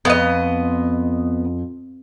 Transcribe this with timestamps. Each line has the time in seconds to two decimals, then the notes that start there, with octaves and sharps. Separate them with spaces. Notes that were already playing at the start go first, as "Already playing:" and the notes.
0.05 F2 B3 D#5